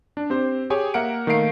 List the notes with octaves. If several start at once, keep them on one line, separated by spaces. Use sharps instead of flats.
D4
C4 G4 C5
G4 G#4 C#5 G#5
A#3 A#4 E5 F#5 C#7 D7
D#3 A3 A#3 F5 C7 D7